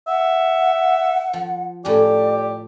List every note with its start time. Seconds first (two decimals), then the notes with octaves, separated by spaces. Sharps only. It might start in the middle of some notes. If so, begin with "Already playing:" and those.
0.08 E5 F#5
1.33 F3
1.85 A2 F3 C#4 G4 D5